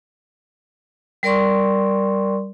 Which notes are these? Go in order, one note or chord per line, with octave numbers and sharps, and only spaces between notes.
G3 A#4 D5 C6 C#6